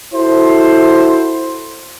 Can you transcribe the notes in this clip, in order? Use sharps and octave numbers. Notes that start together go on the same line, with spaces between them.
E4 F#4 A4 C5